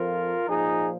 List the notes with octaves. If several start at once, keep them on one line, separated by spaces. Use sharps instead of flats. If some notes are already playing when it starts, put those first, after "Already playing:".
Already playing: F2 F3 F4 A#4
A#2 F3 D#4 G#4